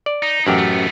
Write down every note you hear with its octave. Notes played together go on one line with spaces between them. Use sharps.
D5
D#4
A1 F#2 D3 G4
A3 B3